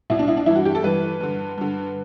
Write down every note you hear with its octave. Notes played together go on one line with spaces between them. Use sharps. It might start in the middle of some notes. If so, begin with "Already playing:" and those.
C2 B2 E4
D4
E4
D4
G2 E3 E4
F#4
G4
A4
G2 E3 B4
G2 D3
G2 D3